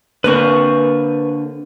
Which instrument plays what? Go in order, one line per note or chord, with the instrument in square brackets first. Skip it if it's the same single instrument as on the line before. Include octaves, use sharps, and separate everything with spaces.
[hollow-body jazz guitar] D3 A#3 C4 [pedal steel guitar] B4 C#6